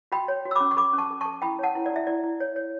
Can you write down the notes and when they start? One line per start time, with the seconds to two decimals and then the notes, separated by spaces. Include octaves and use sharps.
0.12 F#4 G5 B5
0.28 C#5
0.45 F#4
0.51 E6
0.56 C#4 B5 D6
0.71 C#6
0.77 A4 B5 D6
0.93 C#4
0.98 A5 C#6
1.10 A4
1.21 A4 A5 C#6
1.42 E4 G5 B5
1.59 C#5 F#5 A5
1.75 E4
1.86 E4 D5
1.96 E5
2.07 E4 D5
2.24 E4
2.40 C#5
2.56 C#5